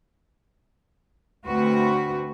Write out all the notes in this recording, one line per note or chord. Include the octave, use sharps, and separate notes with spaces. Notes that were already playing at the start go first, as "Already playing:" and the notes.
D2 A3 C4 F#4 B4